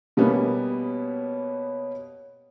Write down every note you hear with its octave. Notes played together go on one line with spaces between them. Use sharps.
B2 G3 A#3 B3 C#4